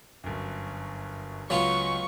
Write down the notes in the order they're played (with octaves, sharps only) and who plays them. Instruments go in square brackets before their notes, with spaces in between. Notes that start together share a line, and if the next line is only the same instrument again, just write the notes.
[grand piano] G1 F#2
[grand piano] C#2 F7 [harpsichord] F#3 B3 F4 [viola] C#6